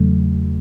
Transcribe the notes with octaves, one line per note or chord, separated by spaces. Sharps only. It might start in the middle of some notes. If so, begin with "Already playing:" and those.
Already playing: E2 C#3 F#3 A3